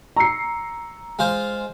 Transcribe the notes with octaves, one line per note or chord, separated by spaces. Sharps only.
A#5 C#6 E6 C7 C#7
G#3 F4 C5 G#5 F6